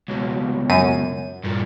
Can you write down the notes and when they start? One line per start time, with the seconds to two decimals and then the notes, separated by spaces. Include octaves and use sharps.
0.08 C#2 B2
0.69 F#2 D#7
1.44 G2 A#2